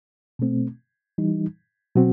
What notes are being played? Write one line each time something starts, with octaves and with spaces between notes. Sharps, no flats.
B2 A3 C4
E3 G3 D#4
B2 F#3 C4 F#4